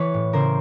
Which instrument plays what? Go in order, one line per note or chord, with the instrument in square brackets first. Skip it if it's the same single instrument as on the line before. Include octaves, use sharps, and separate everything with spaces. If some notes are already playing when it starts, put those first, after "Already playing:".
Already playing: [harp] E3 B4 C#5
A2
C#3 A#4 C5